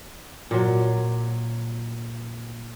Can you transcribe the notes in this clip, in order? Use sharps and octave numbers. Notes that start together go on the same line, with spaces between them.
A#2 F#3